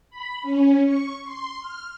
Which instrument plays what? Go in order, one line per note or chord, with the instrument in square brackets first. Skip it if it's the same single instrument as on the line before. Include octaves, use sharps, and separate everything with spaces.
[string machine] B5
C#4
C#6
C6
F6